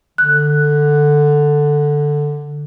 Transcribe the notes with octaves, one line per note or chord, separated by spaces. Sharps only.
D3 F#6